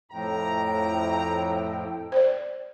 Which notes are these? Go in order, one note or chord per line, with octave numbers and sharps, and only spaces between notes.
F2 A2 A4 G5 A#5
C5 D5